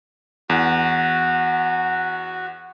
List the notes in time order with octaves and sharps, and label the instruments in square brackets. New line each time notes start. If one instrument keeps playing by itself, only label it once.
[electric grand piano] E2 [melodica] F#4